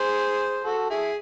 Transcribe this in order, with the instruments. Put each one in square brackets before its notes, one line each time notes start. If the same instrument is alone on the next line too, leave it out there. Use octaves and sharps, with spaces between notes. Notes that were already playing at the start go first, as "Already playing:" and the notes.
Already playing: [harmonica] G#4 C5
F#4 A4
E4 G#4